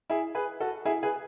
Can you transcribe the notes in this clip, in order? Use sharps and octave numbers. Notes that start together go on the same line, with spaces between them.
E4 G#4
G#4 B4
F#4 A4
E4 G#4
G#4 B4